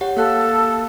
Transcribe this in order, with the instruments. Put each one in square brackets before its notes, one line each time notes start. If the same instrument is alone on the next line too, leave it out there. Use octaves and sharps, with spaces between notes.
[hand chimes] G4 C#5 F#5
[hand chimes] A#3 F5 F#6 [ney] A4